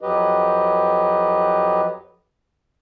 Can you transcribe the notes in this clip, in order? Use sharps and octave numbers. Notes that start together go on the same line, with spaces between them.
F2 F#3 G4 B4 D#5